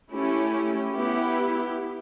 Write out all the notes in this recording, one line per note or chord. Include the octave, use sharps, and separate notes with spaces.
A3 C#4 E4 G4
B3 E4 G4